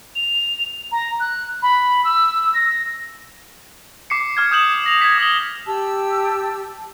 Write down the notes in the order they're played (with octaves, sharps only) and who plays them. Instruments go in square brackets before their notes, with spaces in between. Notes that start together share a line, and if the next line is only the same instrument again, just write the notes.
[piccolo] F7
A#5
F#6
B5
E6
A#6
[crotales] D6 C7 C#7
D6 F6 G#6
D#6 G6 E7 F#7
A#6 F7
G#6 B6
D#6 F#7 G7
[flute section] G4 A5 E6